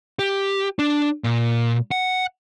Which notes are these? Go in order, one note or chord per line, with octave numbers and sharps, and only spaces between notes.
G4
D4
A#2
F#5